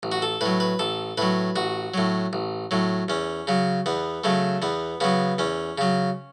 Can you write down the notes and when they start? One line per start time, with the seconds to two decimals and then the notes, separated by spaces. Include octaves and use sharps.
0.03 A1
0.12 F#4
0.22 A4
0.41 A2 F#3 B4
0.60 B4
0.79 A1 A4
1.17 A2 F#3 B4
1.56 A1 F#4
1.94 A2 F#3
2.33 A1
2.71 A2 F#3
3.08 E2 C#4
3.47 C#3 F#3
3.86 E2 B3
4.24 C#3 F#3 A3
4.62 E2 B3
5.00 C#3 F#3 B3
5.38 E2 C#4
5.78 C#3 F#3